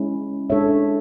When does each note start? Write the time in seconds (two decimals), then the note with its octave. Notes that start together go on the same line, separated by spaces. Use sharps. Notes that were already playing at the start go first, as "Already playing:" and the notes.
Already playing: G#3 C#4 E4
0.50 G#3 D4 A4 C#5 E5